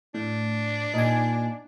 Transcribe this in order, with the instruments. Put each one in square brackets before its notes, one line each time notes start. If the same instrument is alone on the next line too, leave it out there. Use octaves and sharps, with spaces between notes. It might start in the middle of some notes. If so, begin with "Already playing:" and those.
[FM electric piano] A2 [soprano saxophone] D4
[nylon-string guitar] A#2 [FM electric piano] D#4 G#5